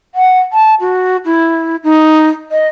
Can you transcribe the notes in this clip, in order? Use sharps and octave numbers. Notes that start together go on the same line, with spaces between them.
F#5
A5
F#4
E4
D#4
D#5